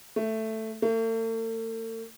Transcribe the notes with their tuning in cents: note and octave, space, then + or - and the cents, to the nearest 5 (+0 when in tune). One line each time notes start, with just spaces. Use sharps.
A3 +5
A3 +45